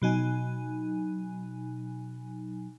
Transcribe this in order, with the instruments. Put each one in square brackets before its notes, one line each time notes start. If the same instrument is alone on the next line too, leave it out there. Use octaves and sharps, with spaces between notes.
[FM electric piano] B2 F#3 D#4 G#5